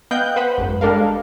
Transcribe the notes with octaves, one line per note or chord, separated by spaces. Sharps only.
B3 D#5 F5 G5 F#6 G6
B4 C5 F#5 B5
G#1 F#2
G3 G#3 D4 A4 A#4 F5